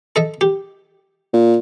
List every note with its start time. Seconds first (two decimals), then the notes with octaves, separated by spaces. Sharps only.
0.16 A4 D#5 E5
0.41 G4
1.33 A#2